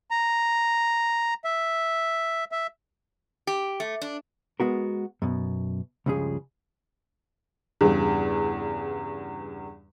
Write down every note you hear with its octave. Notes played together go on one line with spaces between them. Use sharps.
A#5
E5
E5
G4
A3
D4
G#3 B3 F#4 A#4
F#2 B2
C#2 G2 C#3 F3 G#4
E2 G2 C#3